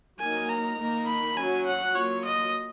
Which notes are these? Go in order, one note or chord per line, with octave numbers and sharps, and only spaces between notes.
F#3 A#3 D#4 A#4 G#5
A#5
D#3 A#3 D#4 A#4
B5
F#3 C#4 F#4 G#5
F#5
F#3 A#3 F4 C#5
D#5